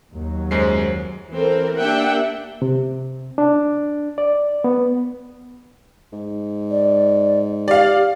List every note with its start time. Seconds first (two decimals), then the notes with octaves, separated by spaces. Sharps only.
0.13 D#2 F#3
0.51 F#2 G#3 C5 C7
1.30 E3 C4 A4 A#4
1.77 A#3 D4 G4 E5 F#5 G5
2.62 C3
3.38 D4
4.18 D5
4.64 B3
6.12 G#2
6.71 D5
7.68 G4 D5 F5